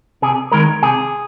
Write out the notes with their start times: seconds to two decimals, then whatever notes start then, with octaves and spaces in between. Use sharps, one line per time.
0.22 C3 G#4
0.52 D#3 G#3 A#4
0.82 C3 G#4